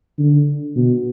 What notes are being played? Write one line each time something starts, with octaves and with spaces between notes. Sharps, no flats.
D3
B2